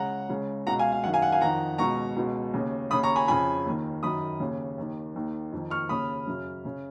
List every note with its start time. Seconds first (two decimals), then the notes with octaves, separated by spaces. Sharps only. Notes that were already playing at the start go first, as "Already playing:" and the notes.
Already playing: C#2 C#3 F#5 A#5
0.29 C#2 C#3
0.66 B2 F#5 A#5
0.70 C#2
0.79 F5 G#5
0.92 F5
1.04 F#2 D#3 F#5
1.13 F5 G#5
1.22 F#5
1.32 F5 G#5
1.41 F2 D#3 F#5 A#5
1.78 C#2 B2 A#5 C#6
2.16 C#2 B2
2.53 D#2 C#3
2.90 D#2 C#3 B5 D#6
3.03 A#5 C#6
3.16 G#5 B5
3.28 F2 C#3 G#5 B5
3.65 D#2 D#3
4.03 F#2 D#3 B5 D#6
4.40 D#2 C#3
4.78 D#2 D#3
5.16 D#2 D#3
5.52 F2 D#3
5.70 C#6 F6
5.89 D#2 C#3 B5 D#6
6.27 F#2 C#3
6.65 C#3